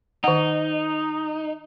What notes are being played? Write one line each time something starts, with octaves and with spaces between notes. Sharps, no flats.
D#3 D#4 F#5